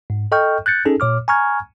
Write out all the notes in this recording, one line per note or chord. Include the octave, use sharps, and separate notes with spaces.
G#2
A4 D#5 G5 C#6 F6 G6
F#6 G6 A6 C#7
C#4 D#4 G#4 A4
A#2 C#5 D6 F6
G#5 A#5 C#6 F6 G#6